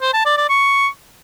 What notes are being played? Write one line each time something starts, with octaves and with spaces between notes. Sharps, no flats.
C5
A5
D5
D5
C#6